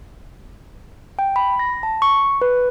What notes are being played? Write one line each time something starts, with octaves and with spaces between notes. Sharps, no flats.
G5
B5
A#6
A5
C#6
B4